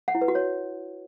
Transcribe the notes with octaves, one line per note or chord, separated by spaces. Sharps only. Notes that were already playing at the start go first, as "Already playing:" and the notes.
F#5
E4
B4
F#4
C#5